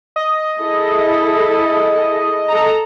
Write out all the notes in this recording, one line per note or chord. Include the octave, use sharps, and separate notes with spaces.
D#5
E4 G#4 A4
A4 A#5